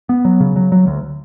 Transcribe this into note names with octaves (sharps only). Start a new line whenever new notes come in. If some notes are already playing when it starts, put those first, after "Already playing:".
B3
F#3
C#3
F#3
F#3
D2